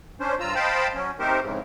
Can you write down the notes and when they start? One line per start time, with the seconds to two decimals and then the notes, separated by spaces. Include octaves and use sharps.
0.20 C#4 D4 C5
0.40 G2 F4 A#5 E6
0.55 C5 D#5 F5 G5 A5 B5
0.94 F#3 C#4
1.19 A3 C4 D#4 G4 A#4 C5
1.41 F2 G#2 C#3 E3